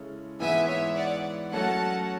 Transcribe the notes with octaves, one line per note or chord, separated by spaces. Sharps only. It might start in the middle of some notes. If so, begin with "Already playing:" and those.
Already playing: C#3 G#3 C#4 E4 A4
G#2 E3 G#3 B3 E4 E5 G#5
C#5 E5
D5 F#5
F#3 A3 C#4 F#4 A4 F#5 A5